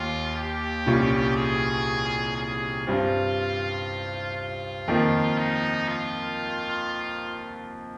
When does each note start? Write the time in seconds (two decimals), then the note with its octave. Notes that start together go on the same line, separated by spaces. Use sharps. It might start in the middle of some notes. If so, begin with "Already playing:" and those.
Already playing: D#2 F4
0.36 G4
0.86 C2 A#2 G3 C#4 F4
1.36 G#4
2.37 G#4
2.87 G2 G3 C4 F4
4.37 F4
4.88 F2 D#3 A#3
5.38 D#4
5.89 F4